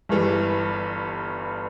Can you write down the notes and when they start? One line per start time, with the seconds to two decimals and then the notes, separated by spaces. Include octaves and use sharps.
0.09 G1 G2 E3 G3